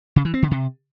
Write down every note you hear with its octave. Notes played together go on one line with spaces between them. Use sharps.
C#3
E3
C4
D3
C3